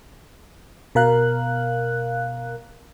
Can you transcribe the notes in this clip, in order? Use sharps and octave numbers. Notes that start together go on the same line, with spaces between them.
B2 A#4 F5 F#6